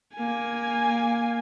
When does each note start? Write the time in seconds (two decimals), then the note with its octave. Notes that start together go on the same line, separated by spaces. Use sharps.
0.14 A#3 G#5